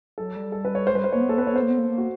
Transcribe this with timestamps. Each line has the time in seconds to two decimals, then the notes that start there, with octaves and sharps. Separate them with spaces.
0.18 F#3 A4
0.36 G3
0.52 A4
0.65 B4
0.75 C#5
0.87 G#3 C5
0.95 G3 B4
1.04 C5
1.12 A#3 C#5
1.21 B3
1.29 A#3 A4
1.37 B3 B4
1.46 A#3 C#5
1.53 B3 C5
1.62 A#3
1.70 B3
1.78 A#3
1.89 A#3
1.98 F#4